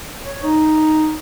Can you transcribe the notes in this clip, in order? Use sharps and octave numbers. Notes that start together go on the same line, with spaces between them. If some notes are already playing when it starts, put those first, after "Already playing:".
C#5
D#4